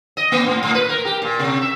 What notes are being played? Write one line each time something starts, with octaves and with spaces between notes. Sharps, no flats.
D#5
A#3
A2
A2
B4
A#4
G4
A#2
C3
E5